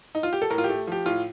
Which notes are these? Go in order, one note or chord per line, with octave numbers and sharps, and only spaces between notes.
D#4
F4
G4
A4
A2 A#4
F4
G4
A3
F3 G4
A2 F4